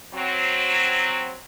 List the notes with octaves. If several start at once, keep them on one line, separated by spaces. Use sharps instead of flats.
F#3 C4